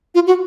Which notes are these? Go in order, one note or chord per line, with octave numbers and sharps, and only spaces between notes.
F4
F#4